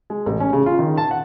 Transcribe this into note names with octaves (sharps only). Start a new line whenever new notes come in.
G#3
A1
C#4
C#3
F4
D#3
A5
F#5